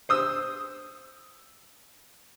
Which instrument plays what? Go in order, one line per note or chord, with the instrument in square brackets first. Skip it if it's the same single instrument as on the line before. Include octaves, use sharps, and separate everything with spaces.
[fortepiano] C5 D#6 E6